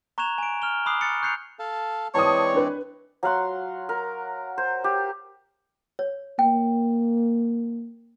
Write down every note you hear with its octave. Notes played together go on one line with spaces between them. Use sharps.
A#5 C#6 F#6 G#6 E7 F7
G#5 D7
F6 F7 G7
B5 D6 D#6 F#6 C7
F#6 A6 C#7
C#6 F#6 G6 C7 C#7 F7
A4 F5 A5
E3 G#3 C4 C#5 D5 A5 D#6
D4 B4
F#3 F5 F#5 C6
A#4
C5
G4
C#5
A#3 G5